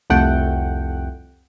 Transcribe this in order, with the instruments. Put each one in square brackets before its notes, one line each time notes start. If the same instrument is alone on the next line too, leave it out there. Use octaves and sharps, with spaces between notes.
[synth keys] C2 F2 A3 F#5 G5